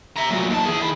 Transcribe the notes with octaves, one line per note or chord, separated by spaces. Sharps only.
E5 A#5
A#2 F#3
D#2 A5
E3 G#4
D#3 B5